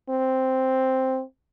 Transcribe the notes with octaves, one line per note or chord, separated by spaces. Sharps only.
C4